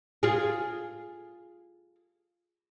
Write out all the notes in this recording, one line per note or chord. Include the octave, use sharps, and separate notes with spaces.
F4 G#4